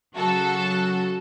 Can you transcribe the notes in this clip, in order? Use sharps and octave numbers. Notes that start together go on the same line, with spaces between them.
C#3 F#3 F#4 A4